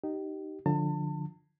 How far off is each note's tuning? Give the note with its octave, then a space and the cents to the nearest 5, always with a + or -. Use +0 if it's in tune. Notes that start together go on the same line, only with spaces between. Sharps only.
D#4 -10 G4 -20
D3 +0 F3 +10 A5 +35